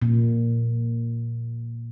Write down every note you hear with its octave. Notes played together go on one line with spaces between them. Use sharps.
A#2